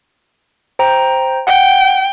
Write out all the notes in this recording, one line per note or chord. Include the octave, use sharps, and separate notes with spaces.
C5 G5 A#5
F#5 G5